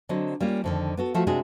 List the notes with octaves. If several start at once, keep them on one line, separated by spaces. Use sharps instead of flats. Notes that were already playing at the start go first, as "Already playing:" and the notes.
D3 F#3 C4 A4 D#5
G3 A#3 C#4 F4
F2 D3 D#3
B3 F#4 A4
F3 A3 F#4 A4
C3 G#3 D4 F#4 G#4